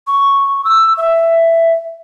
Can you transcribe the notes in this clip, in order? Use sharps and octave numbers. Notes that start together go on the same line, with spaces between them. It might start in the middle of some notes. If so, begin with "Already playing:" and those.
C#6
E6
E5